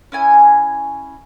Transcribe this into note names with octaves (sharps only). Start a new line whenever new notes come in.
C#4 E4 G#5